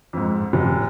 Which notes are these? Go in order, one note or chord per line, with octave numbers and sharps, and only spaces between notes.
F2 G#2
F1